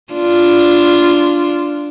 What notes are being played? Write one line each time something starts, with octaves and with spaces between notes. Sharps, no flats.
D4 F4